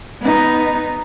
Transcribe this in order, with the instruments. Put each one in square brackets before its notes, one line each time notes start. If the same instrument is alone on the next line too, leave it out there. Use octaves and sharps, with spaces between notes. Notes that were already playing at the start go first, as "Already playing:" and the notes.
[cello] B3 D#4